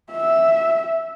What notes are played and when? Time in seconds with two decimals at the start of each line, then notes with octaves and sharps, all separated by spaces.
0.12 E5